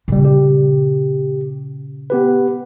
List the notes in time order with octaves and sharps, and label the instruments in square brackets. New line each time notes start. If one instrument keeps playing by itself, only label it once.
[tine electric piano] G1 G3 [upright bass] A#2 C#3
[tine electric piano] G4
B3 G4 B4